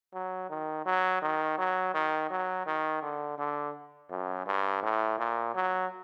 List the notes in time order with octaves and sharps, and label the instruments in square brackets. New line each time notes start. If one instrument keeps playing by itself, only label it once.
[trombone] F#3
D#3
F#3
D#3
F#3
D#3
F#3
D#3
D3
D3
F#2
G2
A2
A#2
F#3